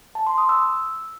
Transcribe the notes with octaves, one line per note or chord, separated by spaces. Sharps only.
A5
C6
D#6
E6